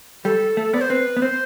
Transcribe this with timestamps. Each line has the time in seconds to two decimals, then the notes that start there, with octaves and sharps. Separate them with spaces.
0.25 G3 A4
0.57 A3
0.74 B3 D5
0.81 C5
0.90 C4 B4
1.17 B3
1.22 C4 C5